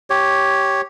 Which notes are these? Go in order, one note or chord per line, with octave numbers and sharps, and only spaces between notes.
G4 C#5